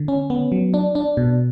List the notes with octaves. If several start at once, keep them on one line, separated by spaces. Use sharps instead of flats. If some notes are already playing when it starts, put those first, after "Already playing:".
Already playing: D3
C#4
B3
F#3
D4
D4
B2